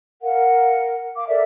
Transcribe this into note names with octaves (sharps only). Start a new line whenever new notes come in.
A#4 F5 F#5
F5 D6
A4 A#4 D5 E5